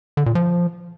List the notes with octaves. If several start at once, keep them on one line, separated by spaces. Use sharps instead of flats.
D3
A#2
F3